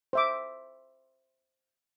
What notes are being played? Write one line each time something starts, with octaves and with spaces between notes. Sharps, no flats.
C5 E5 D6